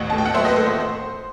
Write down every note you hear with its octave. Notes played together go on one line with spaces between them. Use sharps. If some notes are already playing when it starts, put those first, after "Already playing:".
Already playing: A1 D#2 D#5 F#5
A2 A5
G5
F#5
F#3 C5 E5
B4 D#5
A3 C5
C5